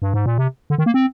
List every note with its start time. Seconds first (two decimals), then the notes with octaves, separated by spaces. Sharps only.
0.02 G2
0.14 G#2
0.26 A#2
0.38 C3
0.70 D3
0.78 D#3
0.86 A#3
0.94 C4